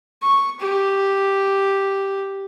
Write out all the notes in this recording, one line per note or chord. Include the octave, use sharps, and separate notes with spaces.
C#6
G4